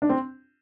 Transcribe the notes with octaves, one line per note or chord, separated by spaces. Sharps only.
D4
C4